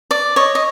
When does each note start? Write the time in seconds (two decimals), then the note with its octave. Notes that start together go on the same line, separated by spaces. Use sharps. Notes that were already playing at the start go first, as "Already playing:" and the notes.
0.11 D5
0.36 C#5 D#5
0.55 D#5